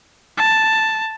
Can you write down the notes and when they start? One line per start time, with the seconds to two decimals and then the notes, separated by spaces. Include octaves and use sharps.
0.37 A5